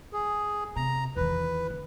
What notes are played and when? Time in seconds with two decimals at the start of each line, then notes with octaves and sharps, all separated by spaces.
0.13 G#4
0.76 C3 A#5
1.16 E2 D#3 B4
1.70 D3